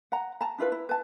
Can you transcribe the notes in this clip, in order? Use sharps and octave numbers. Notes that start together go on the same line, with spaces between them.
F#5 A#5
A5 A#5
D4 E4 F4 B4
E4
B4 A5